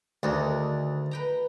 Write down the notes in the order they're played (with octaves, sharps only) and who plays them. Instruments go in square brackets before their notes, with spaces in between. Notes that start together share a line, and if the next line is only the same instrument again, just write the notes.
[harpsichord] D2 [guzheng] D#3 A3 G#4
[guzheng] B4 G5 A#5